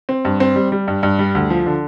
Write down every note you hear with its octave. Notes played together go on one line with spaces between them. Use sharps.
C4
G2
C4
G3
G3
G2
G2
G3
D2
F3
D3